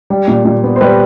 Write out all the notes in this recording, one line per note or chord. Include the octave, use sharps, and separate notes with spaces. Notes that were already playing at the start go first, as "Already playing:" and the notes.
G3
A#2
A#2
B3
C5
G3 B4